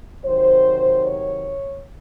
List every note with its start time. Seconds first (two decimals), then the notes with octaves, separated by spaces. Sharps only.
0.25 C3 D#3 F#3 C5
1.06 C#5